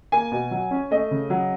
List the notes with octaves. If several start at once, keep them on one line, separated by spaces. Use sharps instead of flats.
A#3 G#5
B2
F#3
C#4
A3 D#5
C#3
F#3